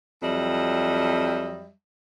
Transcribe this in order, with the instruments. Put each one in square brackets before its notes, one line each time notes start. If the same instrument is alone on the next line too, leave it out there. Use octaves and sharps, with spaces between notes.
[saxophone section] F2 F#3 G3 D#5 E5